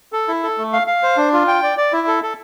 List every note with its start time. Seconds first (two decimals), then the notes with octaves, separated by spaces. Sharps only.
0.13 A4
0.28 E4
0.43 A4
0.58 A3
0.73 F5
0.87 F5
1.03 C5
1.17 D4
1.33 F4
1.48 G5
1.63 D5
1.77 D5
1.93 E4
2.07 A4
2.23 A4